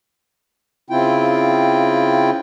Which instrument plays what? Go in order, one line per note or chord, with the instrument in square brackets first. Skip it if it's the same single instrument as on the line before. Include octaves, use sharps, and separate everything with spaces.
[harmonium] C#3 C4 E4 F4 G5